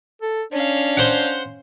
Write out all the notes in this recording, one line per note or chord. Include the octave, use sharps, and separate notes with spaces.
A4
C#4 D4 F5
C5 F#5